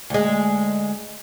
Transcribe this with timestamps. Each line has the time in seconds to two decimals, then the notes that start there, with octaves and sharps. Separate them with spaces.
0.10 D2 G#3